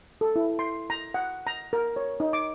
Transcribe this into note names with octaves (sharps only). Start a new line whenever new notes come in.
A4
E4
C6
A#5
F#5
A#5
A#4
C#5
D#4
D6